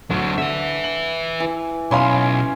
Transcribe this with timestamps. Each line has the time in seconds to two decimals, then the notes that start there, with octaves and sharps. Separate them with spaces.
0.10 D2 D3 F#3
0.38 D3 B4 E5
0.84 F#7
1.40 E3
1.91 B1 C#4 F5 B5 C6